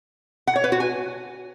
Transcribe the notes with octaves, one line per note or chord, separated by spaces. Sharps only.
F#5
C#5
B4
F#4
G#5